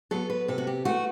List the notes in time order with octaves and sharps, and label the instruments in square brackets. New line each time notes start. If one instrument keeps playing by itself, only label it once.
[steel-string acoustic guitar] F#3 B3 A4
B4
C3 A4
F#4
G4
E3 A3 F#4